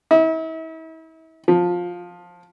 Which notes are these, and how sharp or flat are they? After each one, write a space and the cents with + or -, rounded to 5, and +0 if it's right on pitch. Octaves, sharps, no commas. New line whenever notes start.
E4 -40
F3 +15